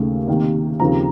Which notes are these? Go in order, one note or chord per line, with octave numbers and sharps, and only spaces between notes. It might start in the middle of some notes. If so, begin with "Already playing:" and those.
Already playing: D#2 C#3 A3
C3 D#3 A#3
D#2 C#3 F3 C4 A#5